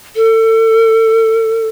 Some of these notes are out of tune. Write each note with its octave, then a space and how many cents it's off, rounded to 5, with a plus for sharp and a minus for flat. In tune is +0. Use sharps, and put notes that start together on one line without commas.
A4 +30